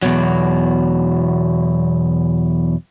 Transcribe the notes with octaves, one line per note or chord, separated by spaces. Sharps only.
E2 B2 F#3